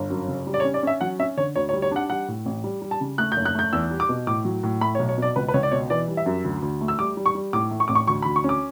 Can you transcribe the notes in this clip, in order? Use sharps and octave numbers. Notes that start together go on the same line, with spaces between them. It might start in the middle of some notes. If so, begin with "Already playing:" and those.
Already playing: G1
F#2
C#3
G3
D5
C#5
C#4
D5
C#4 E5
F#3 F#5
C#4 E5
D3 C#5
D2 C#5
C#5
G3
C#5
D4 F#5
G3 F#5
A2
A1
G3
G3
A5
C#3
A3 F#6
G6
F#1
F#6
A3 G6
E2 E6
G3
D6
B2
A2 D6
F#3
A2
A3 B5
C#5
B1
C#5
B2 D5
C#2 B4
B4
C#2 C#5
D5
B2 C#5
E3 D5
G3
E5
F#2
D2
D2
A3
E6
G3 D6
G3
C#6
G3
A2 D6
A3
C#6
A1 D6
C#6
D2 C#6
D2 B5
C#6
C#4 D6